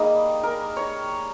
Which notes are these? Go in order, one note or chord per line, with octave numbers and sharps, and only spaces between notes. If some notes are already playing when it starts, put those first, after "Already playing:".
Already playing: G3 A#3 D#4 G#4
A#4
C#5